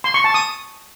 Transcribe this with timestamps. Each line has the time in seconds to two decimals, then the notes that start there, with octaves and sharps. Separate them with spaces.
0.04 C6
0.14 C#6
0.24 A5
0.34 D#6